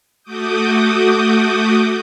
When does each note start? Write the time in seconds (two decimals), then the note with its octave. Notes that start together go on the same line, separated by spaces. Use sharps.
0.23 A3 F#4 D6 D#6 G6